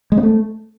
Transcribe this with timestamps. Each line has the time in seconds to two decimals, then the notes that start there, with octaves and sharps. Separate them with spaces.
0.12 G#3
0.17 C4
0.23 A3